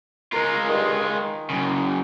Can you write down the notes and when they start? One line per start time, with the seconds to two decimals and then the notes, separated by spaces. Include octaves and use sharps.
0.33 G#3 F4 A#4
0.68 G2 D#3
1.03 D#3
1.50 F#2 C#3